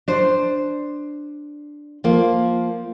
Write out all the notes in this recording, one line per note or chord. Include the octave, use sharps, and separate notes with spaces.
D4 C5
F3 A#3